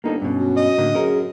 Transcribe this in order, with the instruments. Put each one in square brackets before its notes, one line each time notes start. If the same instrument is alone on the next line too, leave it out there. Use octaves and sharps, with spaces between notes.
[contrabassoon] G1 [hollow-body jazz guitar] A#3 D#4 A4
[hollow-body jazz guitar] G2 B2 [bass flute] C#4
[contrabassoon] F#3
[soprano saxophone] D#5
[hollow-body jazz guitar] A2 D3 A#3
[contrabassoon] F#2 [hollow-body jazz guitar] C#4 A#4 [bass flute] G#4